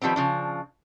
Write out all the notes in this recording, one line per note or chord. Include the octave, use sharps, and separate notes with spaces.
D#3 F3 G3 B3 C4
C#3 F3 D4